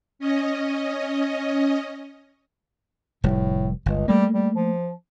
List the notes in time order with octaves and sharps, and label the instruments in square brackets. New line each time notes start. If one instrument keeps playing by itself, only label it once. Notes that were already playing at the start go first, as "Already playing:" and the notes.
[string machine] C#4 D#5
[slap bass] F1 G3 [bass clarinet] A2
[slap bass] G1 [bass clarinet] C#2
[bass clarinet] G3 [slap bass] A3 A#3
[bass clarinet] G3
F3